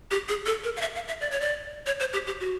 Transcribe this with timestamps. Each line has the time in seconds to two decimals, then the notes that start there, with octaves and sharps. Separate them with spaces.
0.11 G4
0.29 G#4
0.46 A4
0.64 A#4
0.76 F5
0.81 E5
0.95 F5
1.08 E5
1.20 D5
1.31 C#5
1.41 D5
1.86 C#5
2.00 C5
2.13 G4
2.27 G4
2.40 F#4